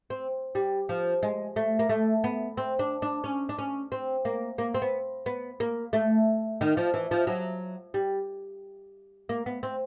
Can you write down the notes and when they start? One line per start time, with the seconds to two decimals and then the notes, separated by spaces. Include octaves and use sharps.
0.10 C4
0.55 G3
0.89 F3
1.23 G#3
1.56 A3
1.79 A#3
1.89 A3
2.24 B3
2.57 C4
2.79 D4
3.02 D4
3.24 C#4
3.49 D4
3.59 C#4
3.92 C4
4.25 A#3
4.58 A#3
4.74 C4
4.82 B3
5.26 B3
5.60 A#3
5.93 A3
6.61 D#3
6.77 F3
6.94 E3
7.11 F3
7.27 F#3
7.94 G3
9.29 A#3
9.46 B3
9.63 C4